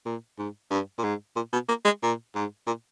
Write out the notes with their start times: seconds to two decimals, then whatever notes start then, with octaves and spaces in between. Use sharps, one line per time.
0.06 A#2
0.38 G#2
0.70 G2
0.98 A#2
1.04 G#2
1.36 A#2
1.53 B2
1.68 A#3
1.85 G#3
2.02 A#2
2.35 G#2
2.67 A#2